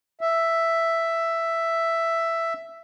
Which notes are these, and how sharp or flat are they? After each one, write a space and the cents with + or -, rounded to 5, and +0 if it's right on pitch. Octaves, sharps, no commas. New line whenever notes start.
E5 +5